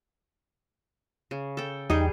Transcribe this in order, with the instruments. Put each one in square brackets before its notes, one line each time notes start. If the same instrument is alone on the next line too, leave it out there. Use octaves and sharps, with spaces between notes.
[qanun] C#3
A4 G5
[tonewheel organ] E2 G5 [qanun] G3 G#4 [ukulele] D#4